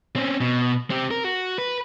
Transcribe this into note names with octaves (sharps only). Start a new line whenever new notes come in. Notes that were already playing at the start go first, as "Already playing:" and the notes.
C4 C#4
B2
C4 G4
A#4
F#4
B4